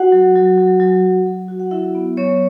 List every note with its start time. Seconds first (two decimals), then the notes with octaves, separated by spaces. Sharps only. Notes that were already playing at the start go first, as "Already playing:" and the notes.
Already playing: F#4 F#5
0.12 F#3
0.35 F#3
0.58 F#3
0.80 F#3
1.04 F#3
1.26 F#3
1.48 F#4
1.60 F#5
1.71 F#3 E4 E5
1.95 B3
2.17 F#3 C#4 C#5